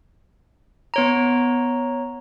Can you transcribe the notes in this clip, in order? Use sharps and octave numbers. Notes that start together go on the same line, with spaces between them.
B3 C#5 A#5